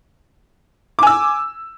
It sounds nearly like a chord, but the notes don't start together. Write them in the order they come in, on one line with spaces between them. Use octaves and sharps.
D6 G#5 E6